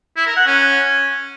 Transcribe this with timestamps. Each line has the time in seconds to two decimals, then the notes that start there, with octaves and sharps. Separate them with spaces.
0.17 E4
0.26 A#4
0.36 F#5
0.46 C#4